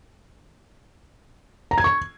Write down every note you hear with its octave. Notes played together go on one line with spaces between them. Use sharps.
A#5
G#6
C#6